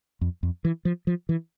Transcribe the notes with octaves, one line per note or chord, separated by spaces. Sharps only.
F2
F2
E3
F3
F3
E3